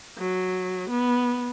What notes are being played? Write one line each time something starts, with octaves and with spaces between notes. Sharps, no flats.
F#3
B3